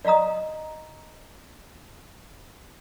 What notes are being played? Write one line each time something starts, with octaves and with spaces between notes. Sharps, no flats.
D5 D#5 F5 A#5 D#6